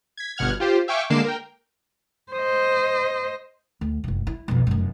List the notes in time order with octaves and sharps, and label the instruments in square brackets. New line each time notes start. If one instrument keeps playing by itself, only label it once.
[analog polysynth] G#6 B6
G1 B2 F#5 F6 G#6
F4 G4 C5
E5 F5 G5 G#5 C#6 D6
D3 G#3 A#3 D6 C7 E7
A#4 G5
[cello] C5 D#5
[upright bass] D2
F#1 C3
E4
B1 F2
F1 F#2